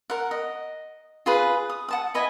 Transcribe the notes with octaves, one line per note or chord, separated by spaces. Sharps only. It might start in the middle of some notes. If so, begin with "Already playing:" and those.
A#4 F#5
D#5
F4 G#4 B4
D#6
F#5 A5 D#6
E4 B4 D#5 G#5